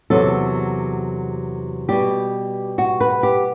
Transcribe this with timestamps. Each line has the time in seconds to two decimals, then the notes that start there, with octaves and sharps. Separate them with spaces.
0.10 E2 C3 F#3 A4
1.89 B2 G3 G4
2.78 F#4
3.01 B4
3.23 G4